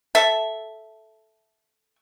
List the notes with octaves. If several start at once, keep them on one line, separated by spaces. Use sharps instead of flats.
A4 E5